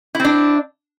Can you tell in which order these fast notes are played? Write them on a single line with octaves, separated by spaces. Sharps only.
E4 C4 D4